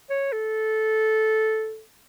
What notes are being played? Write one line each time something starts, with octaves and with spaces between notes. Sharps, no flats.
C#5
A4